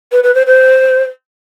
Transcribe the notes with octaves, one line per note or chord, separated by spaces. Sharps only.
B4
B4
C5
C5